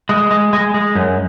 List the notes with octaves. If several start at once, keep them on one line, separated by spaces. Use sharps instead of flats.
G#3
G#3
G#3
G#3
F#2